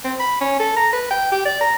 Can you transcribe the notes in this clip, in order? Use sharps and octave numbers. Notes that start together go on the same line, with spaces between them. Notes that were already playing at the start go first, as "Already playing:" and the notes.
C4
B5
C#4
A4
A#5
B4
G5
G4
D5
A#5